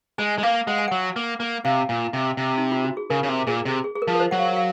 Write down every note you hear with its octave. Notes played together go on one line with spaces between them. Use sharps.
G#3 G#5
G#3
A#3 F5
G#3 F#5
G#5
F#3 F#5
A#3
A#3
C3 F5
A#2
C3
C3
D#4
F4
F#4
G#4
C#3 A#4
C#3
C3
A#2 G#4
C3
G#4
G#4
A#4
F3
A#4
C5
F#3 F#5
F5
F5